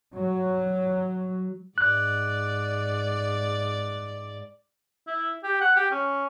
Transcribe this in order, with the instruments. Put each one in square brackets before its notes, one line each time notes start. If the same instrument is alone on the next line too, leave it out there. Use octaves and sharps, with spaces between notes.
[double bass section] F#3
[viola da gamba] G#2 D5 [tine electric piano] F#6
[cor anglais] E4
G4
F#5
G4
C#4